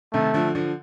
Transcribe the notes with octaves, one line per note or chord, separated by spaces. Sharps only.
C3 D#3 A3
D3 F3
D3 F3